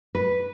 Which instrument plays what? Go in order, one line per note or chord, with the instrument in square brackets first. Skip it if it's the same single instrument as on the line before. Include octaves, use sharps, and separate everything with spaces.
[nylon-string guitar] B4